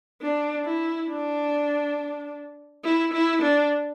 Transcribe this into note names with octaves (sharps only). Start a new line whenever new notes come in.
D4
E4
D4
E4
E4
D4